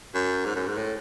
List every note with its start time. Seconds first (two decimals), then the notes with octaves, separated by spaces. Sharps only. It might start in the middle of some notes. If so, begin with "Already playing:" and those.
0.15 F#2
0.45 G#2
0.56 F#2
0.67 G#2
0.77 A2